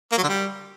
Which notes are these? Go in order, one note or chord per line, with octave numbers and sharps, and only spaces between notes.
A#3
F#3
D3
G3